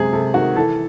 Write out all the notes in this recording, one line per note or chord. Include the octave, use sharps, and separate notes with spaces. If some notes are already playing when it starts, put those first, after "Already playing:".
Already playing: F#2 C3 G#3 G#4
C3 A4
D#3 F#4
E3 A4